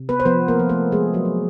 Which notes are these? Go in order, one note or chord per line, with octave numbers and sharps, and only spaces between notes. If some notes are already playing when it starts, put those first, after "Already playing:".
Already playing: C3
B3 B4
C5
F3 B3 B4
A#3 A#4
F3
A3 A4
F3 G#3 G#4
F#3 F#4
A#3